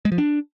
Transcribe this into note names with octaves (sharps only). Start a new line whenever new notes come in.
G#3
F3
D4